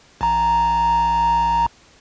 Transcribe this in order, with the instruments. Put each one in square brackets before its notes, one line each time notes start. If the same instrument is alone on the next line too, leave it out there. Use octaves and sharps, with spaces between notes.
[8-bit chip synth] A1 A#5